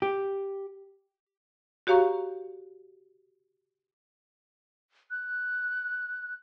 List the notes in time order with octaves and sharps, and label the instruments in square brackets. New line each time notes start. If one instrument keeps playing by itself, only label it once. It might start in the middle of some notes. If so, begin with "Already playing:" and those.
[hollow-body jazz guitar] G4
[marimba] F#4 G4 C#5 F5 A#5 C#6
[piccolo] F#6